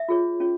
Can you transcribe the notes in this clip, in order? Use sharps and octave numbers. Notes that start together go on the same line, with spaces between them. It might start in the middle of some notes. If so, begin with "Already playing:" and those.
Already playing: E5
F4 G#4 C#5
C#4 F4 G#4 C#5